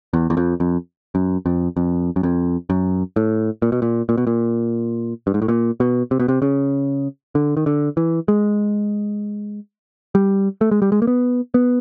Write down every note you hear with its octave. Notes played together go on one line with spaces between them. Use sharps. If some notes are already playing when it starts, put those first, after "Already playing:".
E2
E2
F2
F2
F#2
F2
F2
F#2
F2
F#2
A2
A#2
B2
A#2
A#2
B2
A#2
G2
G#2
A2
A#2
B2
C3
B2
C3
C#3
D3
D#3
D3
E3
G#3
G3
A3
G#3
G3
G#3
A#3
B3
B3